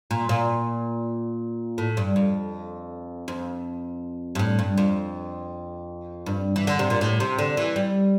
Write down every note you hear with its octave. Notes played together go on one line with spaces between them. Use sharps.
A#2
A#2
A2
G2
F2
F2
G2
A2
G2
F2
G2
E3
D3
C3
A#2
A2
C3
D3
E3
G3